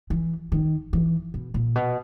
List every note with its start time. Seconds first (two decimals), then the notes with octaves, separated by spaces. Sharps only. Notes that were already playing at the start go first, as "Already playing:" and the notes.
0.10 E3
0.52 D#3
0.93 E3
1.34 B2
1.54 A#2
1.76 B2